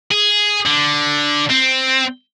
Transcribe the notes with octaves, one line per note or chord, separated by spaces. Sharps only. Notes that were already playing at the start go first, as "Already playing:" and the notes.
G#4
D3
C4